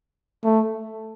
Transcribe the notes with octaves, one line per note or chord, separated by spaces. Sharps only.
A3